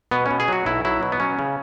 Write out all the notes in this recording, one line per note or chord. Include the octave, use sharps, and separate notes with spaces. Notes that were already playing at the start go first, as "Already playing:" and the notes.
B2 B3
C#4
B2
G#4
F#3 F#4
B1 E4
F#3 E4
B2
B3
F#3 C#4
C#3